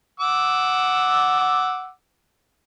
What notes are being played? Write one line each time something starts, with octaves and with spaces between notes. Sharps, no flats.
F#5 D6 E6